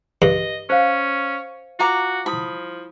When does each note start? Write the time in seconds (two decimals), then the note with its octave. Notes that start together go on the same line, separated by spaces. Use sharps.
0.22 G2 D#5
0.70 C#4 C5 F5
1.80 F4 F#4 A#5 D6
2.26 F3 E4 B5 D#6